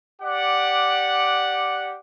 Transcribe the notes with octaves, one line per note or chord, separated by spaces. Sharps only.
G4 D5 F#5